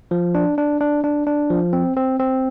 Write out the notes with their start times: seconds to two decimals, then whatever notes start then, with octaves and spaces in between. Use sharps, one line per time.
0.11 F3
0.35 D4
0.58 D4
0.81 D4
1.04 D4
1.27 D4
1.50 F3
1.73 C4
1.97 C4
2.19 C4